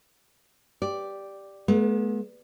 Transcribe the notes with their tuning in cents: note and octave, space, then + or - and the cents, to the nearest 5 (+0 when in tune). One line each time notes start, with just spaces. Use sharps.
G4 +0 D5 +0
G#3 +45 B3 -35